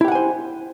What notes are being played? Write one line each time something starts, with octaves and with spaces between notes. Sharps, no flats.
E4 G4 C5 F#5 G#5